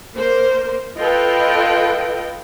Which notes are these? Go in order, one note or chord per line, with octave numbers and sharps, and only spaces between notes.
A#3 A#4 C5
F4 A4 B4 D#5 G5